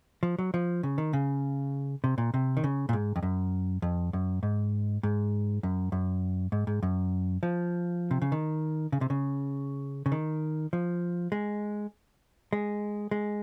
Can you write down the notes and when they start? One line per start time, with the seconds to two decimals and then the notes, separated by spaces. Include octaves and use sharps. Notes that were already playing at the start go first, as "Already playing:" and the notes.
0.23 F3
0.38 F#3
0.54 F3
0.83 C#3
0.98 D#3
1.13 C#3
2.04 C3
2.18 A#2
2.34 C3
2.57 D#3
2.64 C#3
2.89 A#2
2.93 G#2
3.16 F2
3.23 F#2
3.82 F2
4.13 F#2
4.43 G#2
5.03 G#2
5.63 F#2
5.92 F#2
6.52 G#2
6.67 G#2
6.83 F#2
7.43 F3
8.11 C3
8.22 C#3
8.32 D#3
8.92 C#3
9.01 C3
9.10 C#3
10.06 C#3
10.12 D#3
10.73 F3
11.32 G#3
12.53 G#3
13.11 G#3